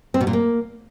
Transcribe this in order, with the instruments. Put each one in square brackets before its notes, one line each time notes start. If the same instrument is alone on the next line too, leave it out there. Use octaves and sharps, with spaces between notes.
[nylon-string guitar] C4
B2
A#2
A#3